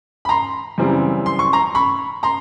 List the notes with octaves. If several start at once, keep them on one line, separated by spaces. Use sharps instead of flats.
B5
A#5 C6
F#2 C#3 E3 G3 C4
C6
C#6
A#5 C6
B5 C#6
A#5 C6